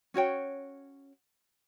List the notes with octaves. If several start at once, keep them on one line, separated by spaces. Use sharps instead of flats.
C#4 F#4 C#5 G5